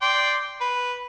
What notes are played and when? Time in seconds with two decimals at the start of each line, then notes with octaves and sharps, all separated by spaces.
0.02 D5 G5 C6
0.61 B4